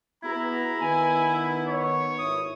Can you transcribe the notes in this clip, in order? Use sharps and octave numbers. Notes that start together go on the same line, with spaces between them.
B3 E4 F#4 G#4 A#5
D#3 B3 D#4 G#5
C#5
G#1 E4 D#6